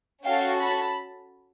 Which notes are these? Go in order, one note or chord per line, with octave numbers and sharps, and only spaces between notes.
C#4 F#4 A4 F5 G5
A5 B5